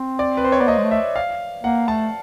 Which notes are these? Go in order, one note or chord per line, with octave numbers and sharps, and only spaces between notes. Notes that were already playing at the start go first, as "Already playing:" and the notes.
Already playing: C4
D5
B4
C5
C#5
B3 D5
A#3 D#5
G#3
A3
E5
F5
A#3 F#5
A3 A5